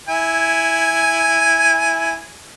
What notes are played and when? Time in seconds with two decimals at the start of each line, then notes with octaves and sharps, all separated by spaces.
0.09 E4 G#5